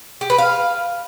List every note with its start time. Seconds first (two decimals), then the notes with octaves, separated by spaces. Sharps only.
0.21 G4
0.30 B4
0.38 F5